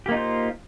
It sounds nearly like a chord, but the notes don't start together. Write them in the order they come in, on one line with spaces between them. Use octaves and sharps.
G4 A#3 D#4 F4 C5